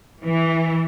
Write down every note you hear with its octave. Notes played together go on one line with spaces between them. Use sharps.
E3